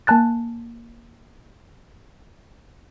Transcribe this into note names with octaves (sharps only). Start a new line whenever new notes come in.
A#3 G#5 A5 F#6 A6